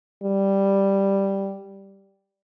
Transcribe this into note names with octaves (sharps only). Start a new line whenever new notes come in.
G3